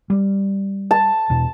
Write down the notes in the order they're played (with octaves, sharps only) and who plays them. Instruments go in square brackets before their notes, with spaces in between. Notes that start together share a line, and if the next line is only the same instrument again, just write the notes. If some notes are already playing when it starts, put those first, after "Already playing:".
[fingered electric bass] G3
[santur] A5
[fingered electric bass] E2 B2